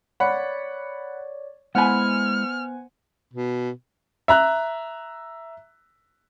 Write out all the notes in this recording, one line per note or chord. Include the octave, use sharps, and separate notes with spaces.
C#5 D5 F#5 B5
G#3 B3 E4 C5 F#5 G#5 B5 F6
B2
E5 A#5 F#6